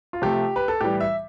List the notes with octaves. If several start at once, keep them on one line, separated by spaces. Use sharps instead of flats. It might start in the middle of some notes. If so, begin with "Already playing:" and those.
F4
C3 F3 A3 G4
B4
A4
A2 E3 G3 G4
E5